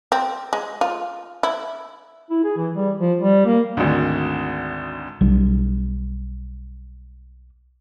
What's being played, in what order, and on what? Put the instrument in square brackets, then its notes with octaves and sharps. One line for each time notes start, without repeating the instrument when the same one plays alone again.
[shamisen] C4
G#3
F4
E4
[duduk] E4
G#4
E3
G3
F3
G3
A#3
[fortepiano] G#1 D2
[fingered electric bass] B1 G3 D4